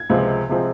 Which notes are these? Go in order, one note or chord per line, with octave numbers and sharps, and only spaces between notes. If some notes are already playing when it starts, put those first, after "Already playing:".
Already playing: G#6
C#2 C3 F3 G#3 C4
C3 F3 G#3 C4